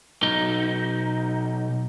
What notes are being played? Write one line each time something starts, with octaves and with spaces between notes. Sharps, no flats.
B1 D#4